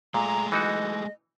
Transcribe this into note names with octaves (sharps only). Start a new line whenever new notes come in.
A#2 G#3 A3 A#5
E3 D#4 F#4 D#5